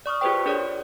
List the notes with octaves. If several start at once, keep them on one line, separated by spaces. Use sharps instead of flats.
D5 C#6 D#6 F6
F4 G4 G#4 B4 C5 G5
D4 G#4 A#4 C#5 D5